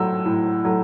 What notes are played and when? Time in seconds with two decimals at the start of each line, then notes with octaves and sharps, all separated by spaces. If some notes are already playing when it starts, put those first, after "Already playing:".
Already playing: A2 F#3 A3 E6
0.26 A2
0.65 F#3 A3